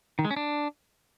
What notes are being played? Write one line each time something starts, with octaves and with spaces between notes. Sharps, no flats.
D#3
G#3
C#4
D4